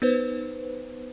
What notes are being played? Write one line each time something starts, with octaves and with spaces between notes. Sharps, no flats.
B3 D#4 B4 C5